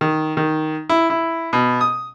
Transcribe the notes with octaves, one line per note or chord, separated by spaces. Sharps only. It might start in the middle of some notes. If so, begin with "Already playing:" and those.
D#3
D#3
E4
E4
B2
D#6